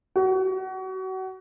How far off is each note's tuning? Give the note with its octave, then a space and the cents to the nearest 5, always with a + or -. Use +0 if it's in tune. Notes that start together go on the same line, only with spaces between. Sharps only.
F#4 +30